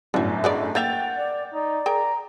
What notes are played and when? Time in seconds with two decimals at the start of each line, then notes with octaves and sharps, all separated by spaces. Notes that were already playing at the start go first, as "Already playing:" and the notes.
0.14 G1 F#2 A2 D3 F#3
0.44 G#3 A3 B3 D5
0.75 A#3 E5 F#5 G5 G6 A6 F7
1.17 D5
1.54 D#4 D5
1.86 G#4 A#4 G5 A#5